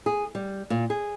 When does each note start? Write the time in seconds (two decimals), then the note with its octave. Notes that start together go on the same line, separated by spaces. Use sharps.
0.06 G#4
0.35 G3
0.70 A#2
0.90 G#4